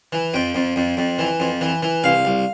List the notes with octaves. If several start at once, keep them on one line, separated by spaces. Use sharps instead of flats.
E3
F2 G5
F2
F2
F2
E3
F2
E3
E3
C2 F5
C2